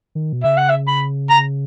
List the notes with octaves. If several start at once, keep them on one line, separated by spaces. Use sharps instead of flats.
D#3
B2
C#3 E5
F#5
E5
B5
A#5